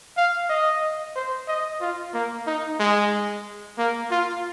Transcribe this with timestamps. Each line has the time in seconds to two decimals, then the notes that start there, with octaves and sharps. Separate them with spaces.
0.17 F5
0.49 D#5
1.16 C5
1.48 D#5
1.81 F4
2.14 A#3
2.47 D#4
2.80 G#3
3.78 A#3
4.11 F4